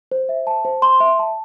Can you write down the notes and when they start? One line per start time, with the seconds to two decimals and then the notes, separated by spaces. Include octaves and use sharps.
0.12 C5
0.29 E5
0.47 A5
0.65 C5
0.82 C6
1.00 E5
1.19 A5